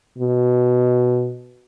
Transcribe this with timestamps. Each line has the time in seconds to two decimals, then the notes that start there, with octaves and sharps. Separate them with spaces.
0.18 B2